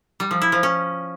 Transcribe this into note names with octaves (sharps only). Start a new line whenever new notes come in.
G3
F3
E4
F3
C#4